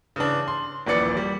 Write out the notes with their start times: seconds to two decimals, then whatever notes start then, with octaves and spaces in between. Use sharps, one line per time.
0.16 C#3 E3 D4
0.48 C6
0.87 D#1 A#1 E3 D5 C#7
1.17 G3